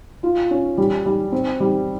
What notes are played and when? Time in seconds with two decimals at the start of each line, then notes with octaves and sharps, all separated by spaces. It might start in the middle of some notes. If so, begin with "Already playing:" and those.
0.23 F4
0.51 C#4
0.78 G3
1.06 G3
1.32 C4
1.60 G3